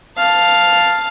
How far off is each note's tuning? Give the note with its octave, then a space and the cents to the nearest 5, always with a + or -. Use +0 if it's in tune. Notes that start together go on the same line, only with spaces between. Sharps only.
F5 +0 A5 +0